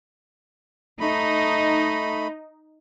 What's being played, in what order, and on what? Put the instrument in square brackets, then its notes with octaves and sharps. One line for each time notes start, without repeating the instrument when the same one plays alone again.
[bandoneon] A3 B5 [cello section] D#4